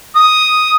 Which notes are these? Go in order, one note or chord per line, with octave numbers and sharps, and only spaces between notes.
D#6